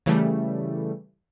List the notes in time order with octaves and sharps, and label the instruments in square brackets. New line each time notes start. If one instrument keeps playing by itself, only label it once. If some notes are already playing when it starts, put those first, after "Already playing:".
[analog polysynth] C#3 E3 G3 A3